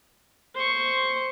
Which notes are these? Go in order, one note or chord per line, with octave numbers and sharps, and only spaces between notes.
C5 C#6